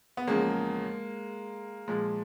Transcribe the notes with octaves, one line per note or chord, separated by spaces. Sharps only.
B3
E2 C#3 F3 G#3 A#3
A#2 F3 G#3